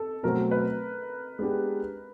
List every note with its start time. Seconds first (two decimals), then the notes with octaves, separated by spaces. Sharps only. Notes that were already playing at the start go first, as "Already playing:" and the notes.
Already playing: A4
0.23 B2 F#3 A3 C4 A#4
0.51 B4
1.39 G#3 B3 D4 G4